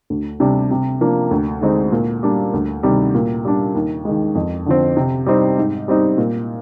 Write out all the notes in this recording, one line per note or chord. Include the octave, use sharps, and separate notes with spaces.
D2
C3 G3 D4
C3
F3 A#3 D4
D2
D3 G#3 C4 D#4
A#2
G3 A#3 D4
D2
C3 D#3 G3
A#2
G3 D4
D#2
D#3 G#3
F2
D3 F3 C4
C3
G3 C4 D#4
G#2
G3 C4 D#4
A#2